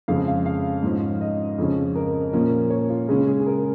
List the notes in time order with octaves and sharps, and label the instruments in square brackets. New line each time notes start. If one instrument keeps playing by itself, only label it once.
[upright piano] F2 C#3 F3 G#3 F5
F5
F5
G#2 F3 C#4
D#5
F2 C#3 F3 C#4
A#4
A#2 F3 A#3 C#4
C#5
F4
C#3 G#3 C#4 G#4
G#4
G#4
A#4